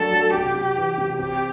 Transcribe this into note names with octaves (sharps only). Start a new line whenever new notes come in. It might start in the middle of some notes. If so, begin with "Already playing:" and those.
Already playing: F#3 A3 D4 A4
F#3
C3 G4
C3
E3
C3
C4 G4